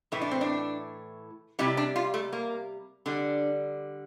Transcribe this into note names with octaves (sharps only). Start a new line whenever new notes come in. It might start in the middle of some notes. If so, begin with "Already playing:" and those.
A2 E3 A3 E4
D4
C4
D4
C3 G3 E4
D4
F4
A3
A#3
D3 G3 D4